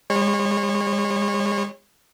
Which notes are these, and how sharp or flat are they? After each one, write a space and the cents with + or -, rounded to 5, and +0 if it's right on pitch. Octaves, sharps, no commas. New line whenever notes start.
G#3 -40 C#5 -25